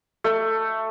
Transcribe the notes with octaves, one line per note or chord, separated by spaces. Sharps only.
A3